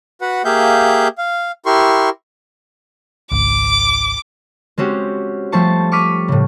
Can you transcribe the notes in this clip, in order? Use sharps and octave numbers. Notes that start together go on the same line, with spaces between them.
F#4 B4 F#5
A#3 G4 G#4 E5 F5 G6
F5
E4 G4 A#4 C6 C#6
G#1 C#2 D6
G#3 C4 C#4 F#4 G4
F3 G3 A3 C5 A5 C#6
C#6 D6 F6 B6 D#7
A2 C#3